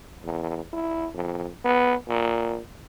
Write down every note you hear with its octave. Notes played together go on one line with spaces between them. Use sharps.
E2
E4
F2
B3
A#2